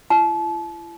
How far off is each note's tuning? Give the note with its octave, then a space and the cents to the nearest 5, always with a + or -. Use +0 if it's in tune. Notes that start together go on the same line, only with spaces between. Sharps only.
E4 +40 A5 -35